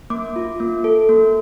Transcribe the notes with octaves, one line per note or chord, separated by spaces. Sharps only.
A#3 D6
F4
A#3
A4
A#3